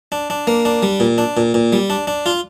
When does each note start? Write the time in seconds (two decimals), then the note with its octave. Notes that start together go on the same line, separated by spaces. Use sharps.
0.12 D4
0.30 D4
0.47 A#3
0.65 D4
0.83 G3
1.00 A#2
1.18 D4
1.37 A#2
1.54 A#2
1.73 G3
1.90 D4
2.07 D4
2.26 F4